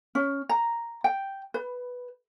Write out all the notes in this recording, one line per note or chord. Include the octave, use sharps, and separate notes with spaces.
C#4
A#5
G5
B4